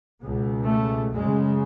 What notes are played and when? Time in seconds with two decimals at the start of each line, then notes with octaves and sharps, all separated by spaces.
0.20 C#2 B2
0.66 A3
1.12 F#2 C#3 G#3